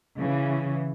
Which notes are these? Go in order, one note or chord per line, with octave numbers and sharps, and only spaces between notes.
C#3 E3